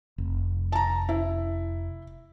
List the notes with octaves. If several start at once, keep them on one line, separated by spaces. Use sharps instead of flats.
F1
A5 A#5
E4